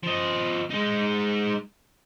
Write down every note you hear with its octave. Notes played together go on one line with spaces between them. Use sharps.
F3 D#5
G#3 D#4